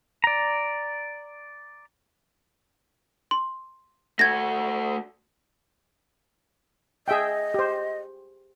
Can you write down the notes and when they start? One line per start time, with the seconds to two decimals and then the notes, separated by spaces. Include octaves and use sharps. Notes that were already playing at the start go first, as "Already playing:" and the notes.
0.24 D5 A#5
3.31 C6
4.19 A3 F#4 G#6 A#6
7.08 G#4 D#5 E5 G5
7.54 G4 C5